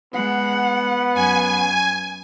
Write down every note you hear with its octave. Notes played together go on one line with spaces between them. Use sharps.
G#3 B3 F#5
F#2 G#5